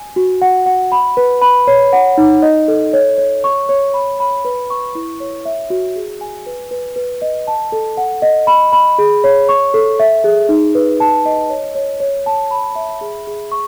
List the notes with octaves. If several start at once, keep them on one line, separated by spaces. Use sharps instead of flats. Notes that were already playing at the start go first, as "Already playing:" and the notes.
Already playing: G#5
F#4
F#5
F#5
B5
B4
B5
C#5
F#5
D#4
D#5
A4
C#5
C#5
C#6
C#5
B5
B5
B4
C#6
E4
C#5
E5
F#4
G#4
G#5
B4
B4
B4
D#5
A5
A4
F#5
D#5
B5
B5
G#4
C#5
C#6
A4
E5
G#4
D#4
B4
A5
D#5
C#5
C#5
C#5
A5
B5
E5
G#4
G#4
C#6